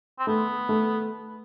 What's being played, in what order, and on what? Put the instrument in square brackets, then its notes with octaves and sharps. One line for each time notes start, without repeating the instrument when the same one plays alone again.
[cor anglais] C4
[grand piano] A3 [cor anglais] B3
[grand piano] A3